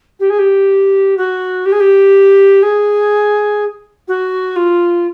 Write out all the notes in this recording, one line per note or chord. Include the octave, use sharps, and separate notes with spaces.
G4
G#4
G4
F#4
G4
G#4
G4
G#4
F#4
F4